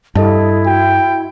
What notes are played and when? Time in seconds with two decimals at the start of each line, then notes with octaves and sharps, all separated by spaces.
0.15 G2 E4 A4 D#5 A5
0.66 F#4 G5